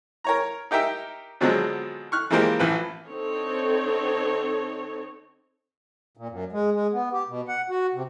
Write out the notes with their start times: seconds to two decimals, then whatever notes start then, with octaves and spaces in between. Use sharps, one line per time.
0.24 A#4 C#5 A#5
0.71 D#4 G4 A#4 E5 G5
1.41 B2 D3 F3 F#3 G#3 C4
2.12 C#6 F6 F#6
2.30 E3 F3 G#3 A#3 G4 C5
2.59 A1 E3 F3 B4
3.07 D3 C4 D#4 A4 C#5
6.17 A#2
6.29 F#2
6.52 G#3
6.74 G#3
6.93 B3
7.13 G4
7.28 B2
7.48 F#5
7.70 F#4
7.94 C3